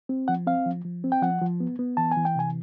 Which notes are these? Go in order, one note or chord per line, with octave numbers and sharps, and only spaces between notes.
C4
F3 F#5
C4 F5
F3
F3
C4
G5
F3 F#5
F3
B3
B3
E3 A5
E3 G#5
G5
C3 G#5